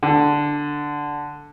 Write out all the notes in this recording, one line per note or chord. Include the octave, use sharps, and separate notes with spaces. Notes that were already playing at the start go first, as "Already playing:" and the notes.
D3